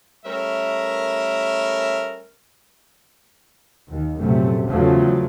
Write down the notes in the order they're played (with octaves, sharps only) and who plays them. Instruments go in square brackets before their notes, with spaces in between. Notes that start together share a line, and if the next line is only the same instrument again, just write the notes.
[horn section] G3 A3 C#4 A#4 E5
[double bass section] D#2
A#1 F#2 C3 A3
E2 C#3 F3 F#3 A3